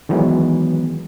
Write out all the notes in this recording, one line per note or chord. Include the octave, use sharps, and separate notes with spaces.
D#3 E3 F#3 G#3 B3